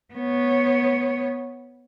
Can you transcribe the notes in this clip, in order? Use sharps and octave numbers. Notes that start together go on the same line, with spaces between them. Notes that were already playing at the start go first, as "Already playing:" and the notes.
B3 C#5